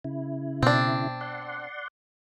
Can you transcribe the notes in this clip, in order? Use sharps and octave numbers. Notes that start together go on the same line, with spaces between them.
C#3 E4
B2 C4 D4
D5 F#5 C6